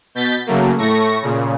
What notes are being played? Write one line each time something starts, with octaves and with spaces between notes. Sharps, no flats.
B2 G6 A6 B6
C#3 F#3 A3 A#3
A2 A3 C#6 A#6
A#2 C#3